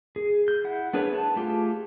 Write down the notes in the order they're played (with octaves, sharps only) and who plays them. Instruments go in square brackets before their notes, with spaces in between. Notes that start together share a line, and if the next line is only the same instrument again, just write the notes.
[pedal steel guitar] G#4
G6
E4 F#5
B3 D4 G#4 B4 C#5
A5
A3 F4 G4 G#4